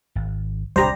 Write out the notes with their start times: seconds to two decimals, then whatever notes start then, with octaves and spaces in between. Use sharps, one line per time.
0.15 G#1
0.76 D1 C2 G3 D4 G4 C5 A#5